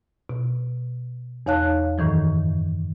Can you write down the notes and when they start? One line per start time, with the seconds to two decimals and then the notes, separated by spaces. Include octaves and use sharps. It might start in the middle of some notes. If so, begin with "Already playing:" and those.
0.29 B2
1.46 E2 D#4 C#5 F5 A5 F#6
1.98 F#2 A2 D#3 E3 F#3